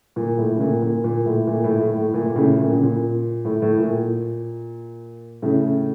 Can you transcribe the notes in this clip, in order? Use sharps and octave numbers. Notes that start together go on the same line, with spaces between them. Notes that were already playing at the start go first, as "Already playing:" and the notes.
A#2
A2
C#3
A#2
A#2
A#2
A2
A#2
A2
A2
A2
A#2
A#2
A2 C#3
A#2
C#3
A#2
A2
A2
A#2
A2 C#3